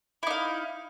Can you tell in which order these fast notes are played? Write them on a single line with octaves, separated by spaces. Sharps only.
E4 D#4 F5